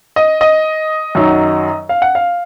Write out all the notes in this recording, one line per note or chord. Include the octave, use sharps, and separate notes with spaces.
D#5
D#5
F#2 D#3 F#3
F5
F#5
F5